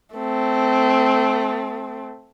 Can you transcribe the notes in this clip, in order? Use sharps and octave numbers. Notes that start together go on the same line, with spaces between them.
A3 C4